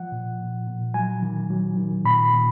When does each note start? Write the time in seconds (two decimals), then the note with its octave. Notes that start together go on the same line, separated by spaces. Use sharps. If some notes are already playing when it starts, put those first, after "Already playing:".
Already playing: F3 F#5
0.12 A#2
0.40 A#2
0.67 A#2
0.94 F#3 G#5
1.22 D#3
1.50 F#3
1.77 D#3
2.05 A#2 B5
2.33 A#2